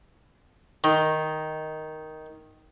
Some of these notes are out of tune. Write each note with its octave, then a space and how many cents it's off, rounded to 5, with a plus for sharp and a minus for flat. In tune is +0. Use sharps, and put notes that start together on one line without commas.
D#3 +5